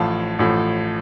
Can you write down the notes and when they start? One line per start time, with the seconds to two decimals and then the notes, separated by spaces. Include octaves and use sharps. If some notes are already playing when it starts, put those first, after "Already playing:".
Already playing: A1 A2 F3 F5 A5
0.39 A1 A2 F3